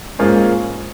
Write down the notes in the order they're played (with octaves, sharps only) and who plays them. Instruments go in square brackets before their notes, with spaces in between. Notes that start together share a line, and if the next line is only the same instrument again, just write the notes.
[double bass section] G#2 G#3 [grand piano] A#3 C#4 F4 G#4 C5